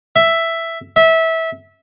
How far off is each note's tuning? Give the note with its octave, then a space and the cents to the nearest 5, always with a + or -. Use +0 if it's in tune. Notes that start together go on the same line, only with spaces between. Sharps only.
E5 +5
E5 -20